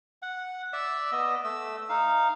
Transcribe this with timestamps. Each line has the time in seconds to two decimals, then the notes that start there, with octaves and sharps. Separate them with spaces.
0.22 F#5
0.73 D5 E5 E6
1.12 B3 D#5
1.44 A3 E6
1.89 D#4 F5